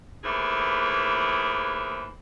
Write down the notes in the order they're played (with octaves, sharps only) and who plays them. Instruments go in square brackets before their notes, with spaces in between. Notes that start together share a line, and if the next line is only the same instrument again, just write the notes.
[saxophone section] D#2 A2 E3 G#4 C5